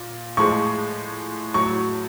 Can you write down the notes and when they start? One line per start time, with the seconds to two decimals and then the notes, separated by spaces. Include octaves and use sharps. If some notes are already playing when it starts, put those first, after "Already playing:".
Already playing: A#2
0.37 A2 F3 G#3 C#6
1.54 A2 F#3 C#6